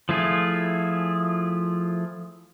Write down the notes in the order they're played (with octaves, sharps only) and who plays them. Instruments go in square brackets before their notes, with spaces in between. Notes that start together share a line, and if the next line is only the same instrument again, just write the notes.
[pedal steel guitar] F3 A3 E4 F4 G#4